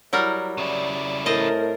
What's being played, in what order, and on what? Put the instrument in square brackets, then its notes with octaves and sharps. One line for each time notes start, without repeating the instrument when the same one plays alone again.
[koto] F#3 G3 A#4 [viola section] E4
[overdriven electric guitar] C#3 E4 [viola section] D5
[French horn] A2 [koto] C4 D#5 A5 [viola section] A#4